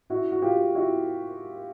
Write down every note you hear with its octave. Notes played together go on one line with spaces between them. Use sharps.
E4 F#4
F#4
F4 G4
E4 F#4